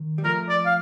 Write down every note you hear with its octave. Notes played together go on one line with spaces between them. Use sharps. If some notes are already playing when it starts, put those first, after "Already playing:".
Already playing: D#3
G3
F3 A3 A#4
D5
F5